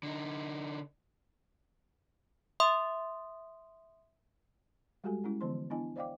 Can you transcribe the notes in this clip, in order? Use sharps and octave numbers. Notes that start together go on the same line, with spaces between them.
D3 D#4
E5 C6 D#6
G3 G#3 F#4 G4 A4 G#5
G#3 C#4 E4
D3 E3 F3 B3 C5 C6
B3 D4 E4 D#5 G#5
C5 D5 D#5 F5 G5 D6